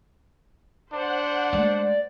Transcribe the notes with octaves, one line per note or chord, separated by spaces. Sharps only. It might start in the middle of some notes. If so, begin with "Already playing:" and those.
D4 C5 F#5
G#3 A3 D5